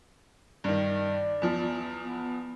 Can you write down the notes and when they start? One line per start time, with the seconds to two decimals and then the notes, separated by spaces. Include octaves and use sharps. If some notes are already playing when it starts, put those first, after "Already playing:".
0.64 G2 D#3 D5
1.42 E2 F3
2.02 B3